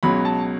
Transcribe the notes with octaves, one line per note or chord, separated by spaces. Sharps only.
C#2 B2 F#3 B5
A5